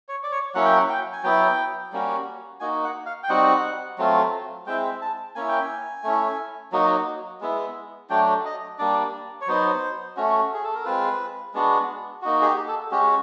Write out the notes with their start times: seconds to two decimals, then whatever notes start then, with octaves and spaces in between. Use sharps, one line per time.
0.09 C#5
0.23 D5
0.32 C#5
0.55 F#3 A#3 C#4 E4 F#5
0.65 G5
0.77 F#5
0.89 G5
1.13 G#5
1.23 F#3 B3 E4 G5
1.92 G3 A#3 C#4 F#4
2.60 A#3 D#4 F#4 G#5
2.84 F#5
3.06 F5
3.23 G5
3.29 G3 C4 D#4 F#4 F#5
3.98 F#3 A3 C4 F4
4.67 G#3 C4 E4 G5
5.01 A5
5.35 A#3 C#4 E4 G#5
5.48 G5
5.62 G#5
6.04 A3 C#4 E4
6.72 F#3 A#3 D#4 F#4
7.41 G#3 B3 E4
8.10 F#3 A3 D4 G5
8.45 D#5
8.79 G3 A#3 D4 D5
9.41 C#5
9.47 F#3 B3 D#4 C5
10.17 A3 C#4 F#4
10.54 G#4
10.64 A4
10.75 A#4
10.85 G#3 C4 F4 B4
11.54 G#3 B3 D4 F#4
12.22 A#3 D#4 F#4
12.42 G#4
12.45 G4
12.68 A4
12.91 G#3 C#4 F#4 G4